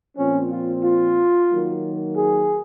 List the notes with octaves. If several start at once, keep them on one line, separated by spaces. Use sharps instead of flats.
A#2 F3 C4 C#4
F4
F4
D#3 F#3 A#3
G#4